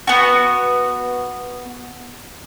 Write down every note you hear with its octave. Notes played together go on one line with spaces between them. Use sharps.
B3 F#4